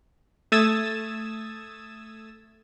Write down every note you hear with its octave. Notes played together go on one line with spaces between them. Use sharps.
A3 D#6 E6 G#6 A6 E7